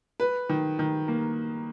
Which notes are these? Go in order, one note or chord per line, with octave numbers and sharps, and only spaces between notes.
B4
D#3
D#3
A#3